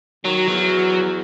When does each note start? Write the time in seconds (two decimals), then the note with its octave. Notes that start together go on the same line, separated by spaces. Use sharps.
0.25 D#3 F#3
0.49 E2 F#3